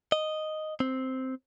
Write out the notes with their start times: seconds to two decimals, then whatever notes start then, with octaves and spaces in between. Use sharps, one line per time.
0.12 D#5
0.80 C4